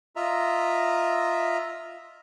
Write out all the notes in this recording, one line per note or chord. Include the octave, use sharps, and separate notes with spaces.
F4 D#5 E5 A#5